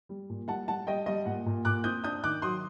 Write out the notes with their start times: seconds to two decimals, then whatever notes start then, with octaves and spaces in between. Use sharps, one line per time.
0.09 G3
0.30 A#2
0.48 G3 F#5 A5
0.68 G3 F#5 A5
0.87 G3 D#5 G5
1.06 G3 D#5
1.26 A#2 F#5
1.46 A#2
1.65 A#2 D6 F#6
1.84 C4 D#6 G6
2.04 D4 D#6 G6
2.24 D#3 D6 F#6
2.42 F#3 C6 D#6